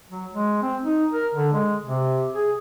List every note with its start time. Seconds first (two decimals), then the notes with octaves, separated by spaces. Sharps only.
0.10 F#3
0.33 G#3
0.62 C4
0.84 D#4
1.12 A#4
1.34 D3
1.54 G#3
1.85 C3
2.34 G#4